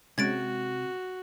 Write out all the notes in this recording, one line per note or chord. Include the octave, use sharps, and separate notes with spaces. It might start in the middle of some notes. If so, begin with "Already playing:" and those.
C3 G#3 C#4 F#4 G#6 A6 D7